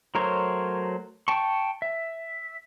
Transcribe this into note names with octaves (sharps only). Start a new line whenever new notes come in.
F#3 A3 A#4 C5 C#5
G5 A5 C#6
E5